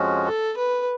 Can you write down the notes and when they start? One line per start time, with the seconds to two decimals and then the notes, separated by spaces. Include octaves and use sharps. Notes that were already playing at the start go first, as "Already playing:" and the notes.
Already playing: F2 F3 G#3 C#4 F#4
0.25 A4
0.57 B4